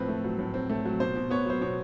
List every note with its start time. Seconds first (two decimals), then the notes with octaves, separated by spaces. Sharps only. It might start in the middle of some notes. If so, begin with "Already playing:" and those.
Already playing: A2 F3 C4 B4
0.08 A3
0.24 F#3
0.39 A2
0.54 C4
0.70 A3
0.85 F#3
1.00 B2 C5
1.16 B2
1.30 B3 C#5
1.45 F#3 C5
1.61 B2 C#5